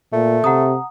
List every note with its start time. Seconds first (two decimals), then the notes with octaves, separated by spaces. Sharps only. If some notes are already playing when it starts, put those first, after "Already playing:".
0.13 A#2 A3
0.44 C3 F#5 A#5 D#6